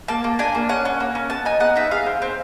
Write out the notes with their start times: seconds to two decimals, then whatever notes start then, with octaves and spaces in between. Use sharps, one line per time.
0.08 A#3 A5
0.24 A#3
0.39 D4 G#5
0.55 A#3
0.69 C#4 F#5
0.85 C#4
1.00 A#3
1.15 C#4
1.30 B3 A5
1.45 D#4 G#5
1.60 B3 F#5
1.76 D#4 E5
1.91 G#4 F5
2.06 C4
2.22 C4